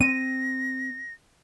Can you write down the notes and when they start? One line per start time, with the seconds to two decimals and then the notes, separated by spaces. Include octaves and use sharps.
0.01 C4 A#6 D#7